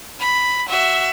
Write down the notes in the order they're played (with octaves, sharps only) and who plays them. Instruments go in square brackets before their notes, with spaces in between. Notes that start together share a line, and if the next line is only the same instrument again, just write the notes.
[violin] B5
F#4 E5